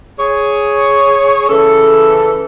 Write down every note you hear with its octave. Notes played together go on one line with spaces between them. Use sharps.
G#4 C#5
C#3 E3 A4